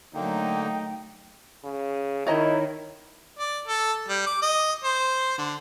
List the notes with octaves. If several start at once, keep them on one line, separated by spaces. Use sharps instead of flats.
D3 F#3 A3 A#3 D#4 G5
C#3
D#3 E4 C#5 D#5 A#5
D5
A4
G3
D6
D#5
C5
D3